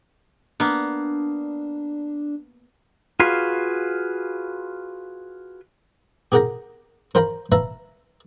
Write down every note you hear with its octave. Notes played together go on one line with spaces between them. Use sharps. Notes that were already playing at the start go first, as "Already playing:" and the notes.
A#3 B3 D4
F4 F#4 G#4 B4 F5
G4 G#4 A#4 F#5 G5 A#5
A#4 C5 F5 G5 A#5 B5
B4 E5 F5 A5 A#5